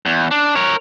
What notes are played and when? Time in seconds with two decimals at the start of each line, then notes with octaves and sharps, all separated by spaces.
0.06 E2
0.31 D4
0.55 A#4 C#5